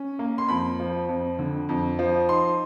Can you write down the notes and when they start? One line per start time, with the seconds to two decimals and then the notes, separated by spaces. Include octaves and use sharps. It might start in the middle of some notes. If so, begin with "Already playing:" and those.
Already playing: C#4
0.19 A#3
0.38 C6
0.49 F2 B5
0.80 F3
1.09 F2
1.39 D3
1.69 F2
1.99 F3
2.29 D#4 C6